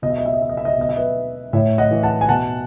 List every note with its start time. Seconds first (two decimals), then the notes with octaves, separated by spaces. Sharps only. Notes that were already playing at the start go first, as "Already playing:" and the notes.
0.02 B2 D#5
0.10 E5
0.18 D#5
0.26 E5
0.34 D#5
0.42 E5
0.49 D#5
0.57 E5
0.65 D#5
0.73 E5
0.78 B2 D#5
0.89 E5
0.97 B4 D#5
1.53 A2 C#5 E5
1.78 D#5 F#5
1.91 E3
2.03 F#5 A5
2.21 G#5
2.29 B2 F#5 A5